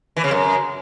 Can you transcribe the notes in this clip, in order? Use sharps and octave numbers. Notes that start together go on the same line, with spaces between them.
E3
C#3
F#2